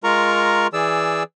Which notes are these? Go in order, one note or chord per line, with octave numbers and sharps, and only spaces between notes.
G#3 F4 A#4 A#5 C#6
E3 G#4 D5 E6